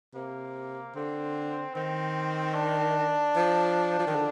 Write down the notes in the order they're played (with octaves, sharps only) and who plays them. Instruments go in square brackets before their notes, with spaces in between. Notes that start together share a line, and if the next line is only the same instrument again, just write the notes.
[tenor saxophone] C3 [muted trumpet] A#3
[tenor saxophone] D3 [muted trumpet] C4
[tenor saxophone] D#3 [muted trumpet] C4
[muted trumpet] D4
[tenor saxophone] F3
F3
D#3
D3